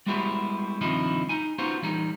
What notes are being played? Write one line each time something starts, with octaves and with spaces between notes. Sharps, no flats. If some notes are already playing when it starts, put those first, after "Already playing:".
G3 G#3 B3 E4 F#4 G4
G2 C3 D#3 F3 D#4 E4
D#4 G#5
B3 C#4 D#4 F4 F#4 C5
E3 G3 D#4